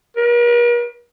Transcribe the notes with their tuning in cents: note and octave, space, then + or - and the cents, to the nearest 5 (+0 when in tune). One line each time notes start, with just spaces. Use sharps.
A#4 +45